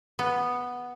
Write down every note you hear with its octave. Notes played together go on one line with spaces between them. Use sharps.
B3